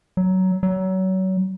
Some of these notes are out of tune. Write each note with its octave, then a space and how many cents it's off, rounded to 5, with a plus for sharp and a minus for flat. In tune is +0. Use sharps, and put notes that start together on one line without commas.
F#3 +15
F#3 +30